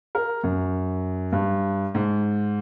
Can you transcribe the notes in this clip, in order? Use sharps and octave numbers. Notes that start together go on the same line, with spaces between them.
A#4
F#2
G2
G#2